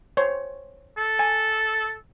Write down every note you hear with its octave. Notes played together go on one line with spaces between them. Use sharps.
C5 C#5
A4
G#5